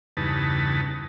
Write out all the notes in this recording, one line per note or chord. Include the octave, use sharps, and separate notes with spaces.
E2 G2 C#3 D#4 B4 A5